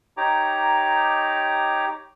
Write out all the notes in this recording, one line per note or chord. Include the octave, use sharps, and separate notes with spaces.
D#4 G4 C#5 A#5 D6